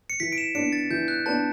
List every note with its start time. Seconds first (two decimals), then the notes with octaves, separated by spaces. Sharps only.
0.10 C#7
0.20 E3 B6
0.32 D7
0.38 E7
0.55 B3 D4 C#7
0.72 A6
0.90 E3 G6
1.08 F#6
1.26 B3 D4 A5